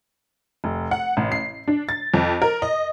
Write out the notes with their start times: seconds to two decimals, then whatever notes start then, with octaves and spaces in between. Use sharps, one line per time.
0.64 F1
0.91 F#5
1.17 A1
1.32 C7
1.68 D4
1.89 A6
2.14 F2
2.42 A#4
2.62 D#5